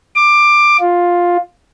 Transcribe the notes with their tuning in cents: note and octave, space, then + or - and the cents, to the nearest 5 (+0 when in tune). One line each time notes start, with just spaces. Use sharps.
D6 +15
F4 +10